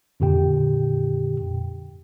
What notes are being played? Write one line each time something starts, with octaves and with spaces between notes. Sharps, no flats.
F2 A#2 D3 G4 G5